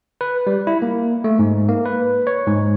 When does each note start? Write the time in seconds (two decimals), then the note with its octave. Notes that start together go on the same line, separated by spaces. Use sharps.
0.21 B4
0.47 G3
0.67 E4
0.82 A#3
1.24 A3
1.39 G#2
1.69 A#3
1.86 B4
2.27 C#5
2.47 G#2